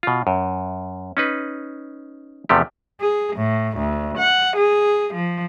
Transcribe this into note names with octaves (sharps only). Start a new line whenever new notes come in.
B2 F4
F#2
C#4 D#4 B4
E2 C3 F3 A3 G4
G#4
A2
D2
F#5
G#4
F3